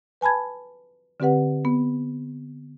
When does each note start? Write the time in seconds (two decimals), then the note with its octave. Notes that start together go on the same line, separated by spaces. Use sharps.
0.21 B4 G#5 A5 B5 G#6
1.20 D3 C4 G4 B4 F#5
1.65 B3